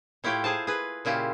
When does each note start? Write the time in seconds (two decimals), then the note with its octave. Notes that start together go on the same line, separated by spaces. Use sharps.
0.24 A2 E4 F4 G4 C#5 G5
0.44 G#4 C5 A5
0.67 G#4 B4
1.05 A#2 C#3 E4 F4 G4